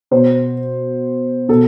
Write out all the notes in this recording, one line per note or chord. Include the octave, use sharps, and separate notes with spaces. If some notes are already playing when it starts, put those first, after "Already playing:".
B2 C5
B2 A4